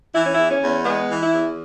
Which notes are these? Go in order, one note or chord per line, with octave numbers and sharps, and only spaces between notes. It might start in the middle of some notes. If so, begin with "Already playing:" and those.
E3 E4
C#4
E2 E4
C#4
E2
G#3 B3
E3
E4
E2